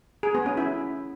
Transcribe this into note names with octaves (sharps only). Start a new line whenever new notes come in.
G#4
B3
C#4
E4